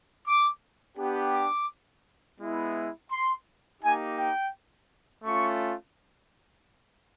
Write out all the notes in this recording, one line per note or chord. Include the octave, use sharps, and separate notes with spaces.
D6
B3 D4 G4
D6
G#3 B3 E4
C6
A#3 D#4 G4 G#5
G5
A3 C#4 F4 C#6